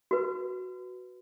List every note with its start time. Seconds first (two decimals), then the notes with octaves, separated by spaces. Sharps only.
0.11 F#4 B4